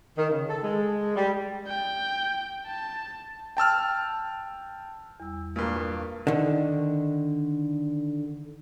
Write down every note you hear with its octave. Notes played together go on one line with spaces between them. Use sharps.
D#3
C#3
A4
G#3
G3
G5
A5
G5 A5 E6 F6
E2 G3 E6
G2 A#2 A#3
A5 C#6 D#6
A#3
D3 D#3